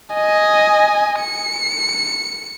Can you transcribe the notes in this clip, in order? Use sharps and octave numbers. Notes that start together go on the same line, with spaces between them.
D#5 G#5
C#7